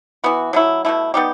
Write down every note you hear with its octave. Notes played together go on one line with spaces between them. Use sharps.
E3 B3 F#4
F#3 A3 E4
B2 A3 E4
G3 B3 D#4 G4